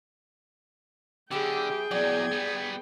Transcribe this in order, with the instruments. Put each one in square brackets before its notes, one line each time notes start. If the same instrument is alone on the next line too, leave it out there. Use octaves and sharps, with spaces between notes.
[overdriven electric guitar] D3 [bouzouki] F#3 B3 E4 [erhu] G4 [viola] G#4 G5
[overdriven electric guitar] E2 F#3 [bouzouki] D5 [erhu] G#6
[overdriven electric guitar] G3 B3